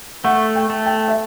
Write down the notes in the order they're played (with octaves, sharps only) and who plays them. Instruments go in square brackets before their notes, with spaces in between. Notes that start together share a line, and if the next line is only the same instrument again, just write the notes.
[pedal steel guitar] A3 [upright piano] F#5
[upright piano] G5
[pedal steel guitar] A3
[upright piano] G5
E5